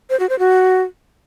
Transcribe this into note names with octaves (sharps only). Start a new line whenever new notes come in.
C5
F#4
C5
F#4